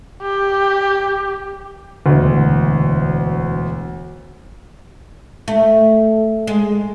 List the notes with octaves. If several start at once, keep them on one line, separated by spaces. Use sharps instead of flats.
G4
E1 D2
A3
G#3